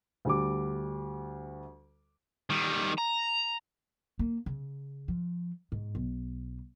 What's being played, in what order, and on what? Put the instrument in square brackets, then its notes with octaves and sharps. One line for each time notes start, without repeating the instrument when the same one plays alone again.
[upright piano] D2 G3 D6
[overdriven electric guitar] D#3 G3
A#5
[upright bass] A#3
C#3
F3
G#2
B1